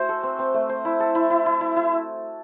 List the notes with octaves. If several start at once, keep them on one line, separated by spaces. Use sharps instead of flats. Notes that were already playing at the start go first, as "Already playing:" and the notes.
Already playing: A3 F#4 C5
A4
C4
C4
A3
C5
E4
A4
E4
E4
E4
E4
E4